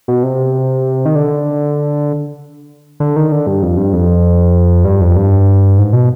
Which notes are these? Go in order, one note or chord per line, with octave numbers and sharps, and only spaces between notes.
B2
C3
D#3
D3
D3
D#3
D3
G2
F2
G2
F2
G2
F2
G2
G#2
B2